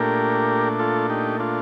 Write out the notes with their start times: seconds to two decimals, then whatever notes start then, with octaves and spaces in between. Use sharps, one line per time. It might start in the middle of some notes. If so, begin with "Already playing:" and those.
Already playing: A#2 A3 D4 G4 A#4
0.79 F4 A4
1.10 D#4 G4
1.40 D4 F4